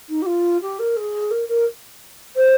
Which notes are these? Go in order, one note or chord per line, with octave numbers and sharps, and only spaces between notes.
D#4
G4
F4
G4
A#4
G#4
A#4
A#4
C5